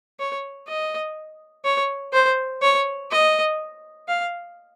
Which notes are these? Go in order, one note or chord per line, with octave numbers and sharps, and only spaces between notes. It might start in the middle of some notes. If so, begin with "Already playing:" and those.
C#5
D#5
C#5
C5
C#5
D#5
F5